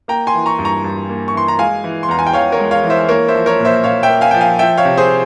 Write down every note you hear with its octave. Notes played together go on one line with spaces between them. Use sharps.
A#3 G5 A#5
G#5 C6
E3
A#5 C#6
G2
A#5 C#6
G2
A#3
C#6
E3 C6
A#5
G#3 F5 G#5
E3
C6
E2 A#5
G#5
G5
E2 C#5 F5
A#4 C#5
G#3
C#5 F5
E3
C5 E5
A#3 A#4 C#5
C5 E5
F3
A#4 C#5
A#2
C5 E5
A#2 C#5 F5
E5 G5
A#3
F5 G#5
F3 G5
F5 G#5
F3 E5 G5
C#5 F5
C3
G#4 C5